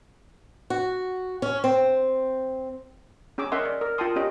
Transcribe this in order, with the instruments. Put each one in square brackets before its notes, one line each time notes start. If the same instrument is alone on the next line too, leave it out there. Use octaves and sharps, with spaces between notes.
[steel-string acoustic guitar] F#4
C#4
C4
[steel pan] C#4 G#4 G#5 D6 E6
C#4 A#4 D#5 E5 F#5 C6
D5
A#4
F4 A#4 G5 A5 C6 D#6
C#4 G4 D#5